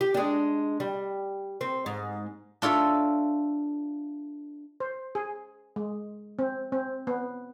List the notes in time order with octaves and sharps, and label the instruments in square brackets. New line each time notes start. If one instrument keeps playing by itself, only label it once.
[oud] G4
G#3 D4
G3
C4
G#2
[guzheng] D4 F4 A4 C#5 E5
[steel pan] C5
G#4
G#3
C4
C4
B3